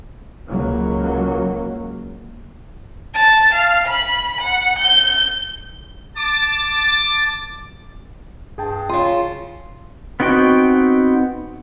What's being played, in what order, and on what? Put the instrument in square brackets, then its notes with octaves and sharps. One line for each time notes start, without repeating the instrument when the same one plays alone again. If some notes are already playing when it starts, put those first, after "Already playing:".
[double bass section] C#2 F#3 A#3
[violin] A5
F5
B5
F#5
G6
[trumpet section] A5 D6
[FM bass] G2 [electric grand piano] G#4 G5 A5
[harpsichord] C#3 D#6 [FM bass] F4 [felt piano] C6
[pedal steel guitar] B3 C4 D#4 F#4 G5